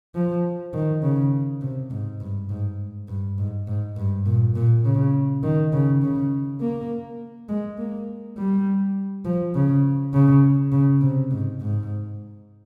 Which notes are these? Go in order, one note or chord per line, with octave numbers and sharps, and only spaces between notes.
F3
D#3
C#3
C3
G#2
G2
G#2
G2
G#2
G#2
G2
A#2
A#2
C#3
D#3
C#3
C#3
A#3
G#3
A#3
G3
F3
C#3
C#3
C#3
C3
G#2
G#2